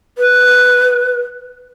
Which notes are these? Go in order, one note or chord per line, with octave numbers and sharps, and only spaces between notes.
B4